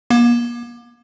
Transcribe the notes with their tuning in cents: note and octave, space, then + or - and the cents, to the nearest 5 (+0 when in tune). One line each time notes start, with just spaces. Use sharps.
A#3 +40